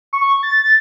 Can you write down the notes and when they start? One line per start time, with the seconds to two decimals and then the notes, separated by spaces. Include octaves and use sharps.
0.13 C#6
0.43 A6